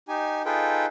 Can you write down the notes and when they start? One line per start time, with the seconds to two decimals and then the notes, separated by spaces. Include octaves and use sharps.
0.08 D#4 G4 G#5
0.45 D#4 F4 G#4 A4 B4 G5